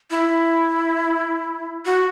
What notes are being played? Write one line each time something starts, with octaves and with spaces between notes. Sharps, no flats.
E4
F#4